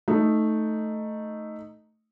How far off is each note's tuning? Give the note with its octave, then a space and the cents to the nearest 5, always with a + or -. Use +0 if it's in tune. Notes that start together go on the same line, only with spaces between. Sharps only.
A3 +0 D#4 +0